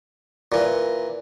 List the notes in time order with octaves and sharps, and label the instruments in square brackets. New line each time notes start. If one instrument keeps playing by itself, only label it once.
[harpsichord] A#2 E3